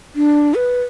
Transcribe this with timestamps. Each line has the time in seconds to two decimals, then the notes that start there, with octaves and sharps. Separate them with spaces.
0.15 D4
0.55 B4